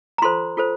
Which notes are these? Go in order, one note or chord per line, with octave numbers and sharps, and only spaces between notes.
A#5
F4 A4 C5 C6
F4 A4 C5